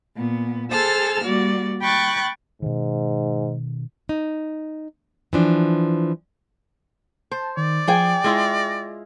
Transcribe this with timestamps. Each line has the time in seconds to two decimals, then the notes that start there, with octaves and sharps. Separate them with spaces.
0.16 A#2 B3
0.70 G#4 A4 C5 A5 E6 F6
1.24 G3 A#3 F#4 D5
1.81 G5 B5 C#6 F#6 A6
2.62 G#2 B2 D#3
4.09 D#4
5.33 E3 F3 D4
7.31 C5 A5
7.57 D#3 D5
7.88 F3 G#4 G5 G#5
8.24 G#3 E4 F4 A#6